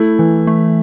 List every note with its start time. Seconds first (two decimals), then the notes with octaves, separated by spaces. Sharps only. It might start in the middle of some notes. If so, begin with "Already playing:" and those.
Already playing: A3 E4
0.19 E3
0.47 A3